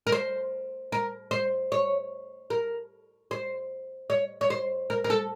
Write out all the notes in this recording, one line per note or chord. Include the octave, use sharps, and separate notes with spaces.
A#4
C5
A#4
C5
C#5
A#4
C5
C#5
C#5
C5
A#4
A#4
A4